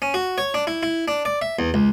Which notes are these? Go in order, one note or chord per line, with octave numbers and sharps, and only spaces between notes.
C#4
F#4
C#5
D4
E4
E4
D4
D5
E5
E2
C#2